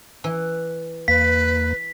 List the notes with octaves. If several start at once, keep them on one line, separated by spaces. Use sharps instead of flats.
E3
E2 A#3 B4 B6